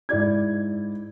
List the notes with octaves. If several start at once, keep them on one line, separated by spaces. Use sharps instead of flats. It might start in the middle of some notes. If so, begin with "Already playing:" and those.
G#2 E4 D5 G#6